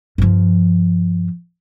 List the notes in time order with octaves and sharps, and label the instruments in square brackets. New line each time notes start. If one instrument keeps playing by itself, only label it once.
[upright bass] G2 F3